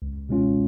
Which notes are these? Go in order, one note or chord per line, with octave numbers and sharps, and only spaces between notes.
C#2
B2 G#3 C#4 F4